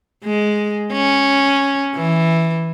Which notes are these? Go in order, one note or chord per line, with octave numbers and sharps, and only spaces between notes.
G#3
C#4
E3